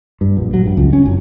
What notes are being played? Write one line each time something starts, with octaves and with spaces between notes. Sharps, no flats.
G2
A#1
F#3
G2
C#2
C#4
F#1